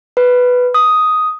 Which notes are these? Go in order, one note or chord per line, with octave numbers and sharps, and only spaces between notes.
B4
D#6